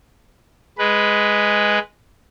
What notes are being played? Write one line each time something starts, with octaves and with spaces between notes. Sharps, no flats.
G#3 B4